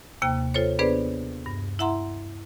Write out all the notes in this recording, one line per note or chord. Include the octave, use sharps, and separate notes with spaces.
D#2 C3 A#3 G5
F4 A4 C5 C#5
B3 D4 G#4 B4 C5 D5
G2
E4 E5 F#5 A#5 C6